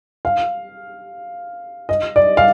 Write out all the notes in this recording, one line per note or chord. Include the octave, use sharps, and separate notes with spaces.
F5
D#5
D5
F5